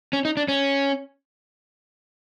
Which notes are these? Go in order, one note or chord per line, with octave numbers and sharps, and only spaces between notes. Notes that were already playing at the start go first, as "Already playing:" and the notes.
C#4
D#4
D4
C#4